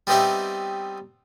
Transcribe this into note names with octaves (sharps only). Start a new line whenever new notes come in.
G3 B3 C4 D#4 G4 E5